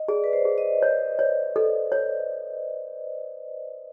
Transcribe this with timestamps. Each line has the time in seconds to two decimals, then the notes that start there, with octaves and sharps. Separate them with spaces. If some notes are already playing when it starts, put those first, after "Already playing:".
Already playing: D#5
0.08 G#4 D5
0.24 B4
0.33 C5
0.45 G#4
0.58 D#5
0.82 C#5
1.19 C#5
1.56 A4
1.92 C#5